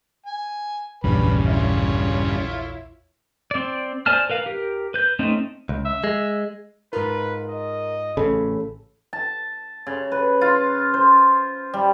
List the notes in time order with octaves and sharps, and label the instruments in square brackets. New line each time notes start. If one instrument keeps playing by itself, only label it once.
[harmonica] G#5
[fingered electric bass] A#1 E2 [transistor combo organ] G2 C#3 [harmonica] B4
[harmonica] E4 F4 C#5
[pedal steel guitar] C4 D5
C5 D5 G#5 A5 F6
A#4 B4 F5
G4 A#4
B4 G6
A3 C4 C#4 D#4
[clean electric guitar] C#2
[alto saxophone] E5
[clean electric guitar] G#3
[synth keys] G#2 D#4 F4 [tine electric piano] A#4 [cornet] B4
[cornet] D#5
[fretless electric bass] A1 C#3 [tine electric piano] A4 B5
[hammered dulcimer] A5
C#3
B4
F4
C5
G3